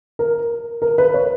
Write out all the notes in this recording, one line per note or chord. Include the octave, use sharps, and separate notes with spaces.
A#4
A#4
B4
C#5